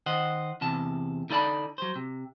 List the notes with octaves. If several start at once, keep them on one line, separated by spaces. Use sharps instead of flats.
D#3 C5 D#5 F#5
E2 C3 A5
D3 D#4 E4 D5 A5 B5
F#3 C5
C3